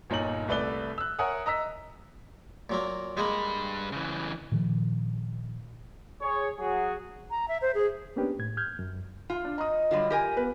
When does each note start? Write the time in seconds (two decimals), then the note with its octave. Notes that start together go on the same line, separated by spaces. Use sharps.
0.10 G1 A#2 D#4 C#5 A#5 F#7
0.48 C2 A3 B4 D5 E5 G7
0.98 E6 F#6
1.19 A#4 C#5 E5 F#5 G#5 D#6
1.46 D#5 A#5 E6 B6
2.70 A#2 F#3 A#3
3.17 G2 G#3 A#3 B5
3.92 C#3 E3
4.52 A#2 D#3 F3
6.21 G#4 C#5
6.59 F#3 F#4 G#4
7.31 A#5
7.48 E5
7.62 C5
7.75 G#4
8.16 A#3 B3 C#4 D4 G4 B4
8.39 A2 G#6
8.57 F6 G6 G#6
8.79 F#2
9.30 F4
9.45 D4
9.58 D#5 A#5 D#6
9.91 D3 F#3 G3 F4
10.10 G4 A#4 G#5
10.37 B3 B4